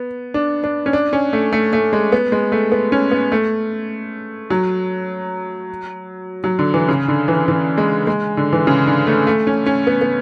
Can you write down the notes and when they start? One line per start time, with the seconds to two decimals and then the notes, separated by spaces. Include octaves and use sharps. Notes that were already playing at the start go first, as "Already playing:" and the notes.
Already playing: B3
0.34 D4
0.64 D4
0.86 C#4
0.93 D4
1.13 C#4
1.33 A3
1.53 A3
1.73 A3
1.93 G#3
2.12 B3
2.32 G#3
2.52 A3
2.72 B3
2.92 C#4
3.11 B3
3.32 A3
4.50 F#3
6.44 F#3
6.59 D3
6.74 E3
6.88 C#3
7.08 D3
7.28 E3
7.48 E3
7.78 G#3
8.07 G#3
8.37 D3
8.53 E3
8.67 C#3
8.87 D3
9.07 A3
9.27 A3
9.47 C#4
9.66 C#4
9.87 B3
10.01 B3